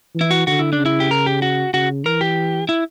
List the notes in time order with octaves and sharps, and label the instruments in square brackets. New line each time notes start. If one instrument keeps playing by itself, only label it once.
[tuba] E3
[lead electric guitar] E4
F#4
[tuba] D3 [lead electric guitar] F#4
[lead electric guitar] E4
D4
[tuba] C#3
[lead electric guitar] E4
G4
A#4
G4
F#4
[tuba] C#3 [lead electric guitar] F#4
[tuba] E3 [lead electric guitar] A#4
[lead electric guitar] G4
E4